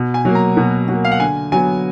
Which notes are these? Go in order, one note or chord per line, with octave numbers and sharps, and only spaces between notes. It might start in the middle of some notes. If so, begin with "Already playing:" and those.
Already playing: B2
G#5
F#3 A#3
A#5
B2
F#3 A#3
F5
F#5
D3 G#5
F#3 B3 G#5